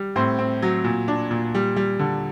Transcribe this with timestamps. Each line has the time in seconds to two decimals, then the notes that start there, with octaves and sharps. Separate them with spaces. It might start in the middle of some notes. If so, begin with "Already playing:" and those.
Already playing: G3
0.16 A2 C4 C5
0.38 C4
0.62 F#3
0.84 A#2
1.08 D4
1.31 A#2
1.55 G3
1.76 G3
1.99 D3